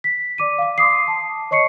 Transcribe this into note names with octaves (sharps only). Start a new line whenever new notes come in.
B6
D5 D6 D#7
F5 D6
C6 D6 D#6 C7
A5
C#5 D#5 C#6 C7 C#7